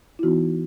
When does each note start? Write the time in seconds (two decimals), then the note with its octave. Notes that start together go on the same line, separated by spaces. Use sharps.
0.19 E4
0.23 E3 B3 D#4 F#4